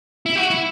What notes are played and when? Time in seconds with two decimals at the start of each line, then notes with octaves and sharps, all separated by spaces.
0.26 E4
0.36 F#4
0.50 E4